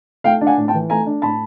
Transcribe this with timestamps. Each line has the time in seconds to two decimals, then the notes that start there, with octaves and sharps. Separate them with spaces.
0.24 A3 F5 G5
0.41 D4
0.47 F#5 G#5
0.57 A2
0.68 G5 A5
0.74 E3
0.90 A3 G#5 A#5
1.06 D4
1.22 A2 A5 B5